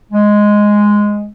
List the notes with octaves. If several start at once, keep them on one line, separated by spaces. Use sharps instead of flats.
G#3